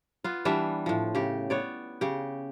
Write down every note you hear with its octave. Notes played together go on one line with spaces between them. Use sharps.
B3 F4
E3 G3 D4 E5
A2 F3
C#3 G4
B3 C#5 D5
C#3 G4